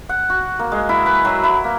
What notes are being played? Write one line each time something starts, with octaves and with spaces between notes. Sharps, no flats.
F#5
F#4
A#3
G#3
E4
B4
F#3
E4
A#3